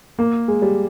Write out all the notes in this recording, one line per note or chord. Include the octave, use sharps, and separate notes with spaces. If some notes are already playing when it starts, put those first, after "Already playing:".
A#3
G#3
G3